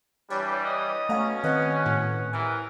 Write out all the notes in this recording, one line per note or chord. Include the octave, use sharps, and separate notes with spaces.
E3 G3 D4 C#5
D#5
B2 A3 C#4 F5 F#5 A#5
D#3 C4 B4 D#5 F#5
A2 F#5
C3 E3 A#4 G#5